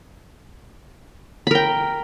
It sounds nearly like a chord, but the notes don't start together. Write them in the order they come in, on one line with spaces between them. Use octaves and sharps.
B5 A#4 G5